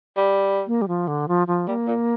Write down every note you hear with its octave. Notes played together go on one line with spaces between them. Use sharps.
G3
A#3
G3
F3
D3
F3
F3
G3 A#3
A#2